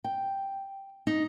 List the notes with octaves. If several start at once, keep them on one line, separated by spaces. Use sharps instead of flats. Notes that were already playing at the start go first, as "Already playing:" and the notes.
G5
D#4